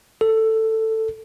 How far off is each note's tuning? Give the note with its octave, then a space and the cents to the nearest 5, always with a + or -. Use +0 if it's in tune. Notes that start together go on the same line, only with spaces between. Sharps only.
A4 +10